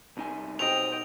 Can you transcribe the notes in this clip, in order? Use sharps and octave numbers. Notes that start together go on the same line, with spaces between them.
C2 D#4 G#5
B2 C4 D#4 G4 C5 D#5 G5 F7